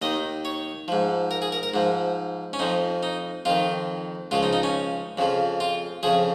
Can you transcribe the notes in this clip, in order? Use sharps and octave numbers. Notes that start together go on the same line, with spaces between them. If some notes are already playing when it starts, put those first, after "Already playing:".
D#2 D#3 D#5
C#5
G#2 F3
A#4
G#4
A#4
A#4
G#2 F3
C#4
F2 F3 D#4
D#4
F2 D#3 F4
C#2 C#3 F3 F4
D#4
D#4
C#4
F2 C#3 F3
F4
F2 C#3 F3 G#4